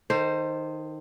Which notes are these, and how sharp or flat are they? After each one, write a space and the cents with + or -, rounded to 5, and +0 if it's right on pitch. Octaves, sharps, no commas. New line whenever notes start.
D#3 +0 A4 +40 C5 +5